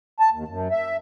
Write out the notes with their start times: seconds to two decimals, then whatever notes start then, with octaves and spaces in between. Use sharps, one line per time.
0.20 A5
0.33 D#2
0.48 F#2
0.71 E5